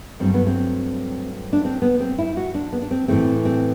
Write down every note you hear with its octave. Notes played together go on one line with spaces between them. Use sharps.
G2 F#3 A3 C4
B3
C4
D4
C4
B3
C4
E4
F#4
D4
B3
D4
C4
A2 E3 A3 C4
C4